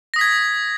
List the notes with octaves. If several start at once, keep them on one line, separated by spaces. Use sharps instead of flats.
D#6 G#6 A#6 B6